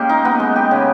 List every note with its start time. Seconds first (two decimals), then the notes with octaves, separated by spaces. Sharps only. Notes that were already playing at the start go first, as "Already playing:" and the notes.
Already playing: G#3 A#3 C#4 G4
0.09 D#4
0.25 B3
0.40 G#3
0.56 G4
0.71 C#3